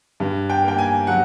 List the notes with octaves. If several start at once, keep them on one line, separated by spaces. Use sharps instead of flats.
G2
G5
A#3 G5
G#5
F#3 F#5